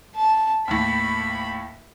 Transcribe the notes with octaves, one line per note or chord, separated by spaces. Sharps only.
A5
D#2 A2 B5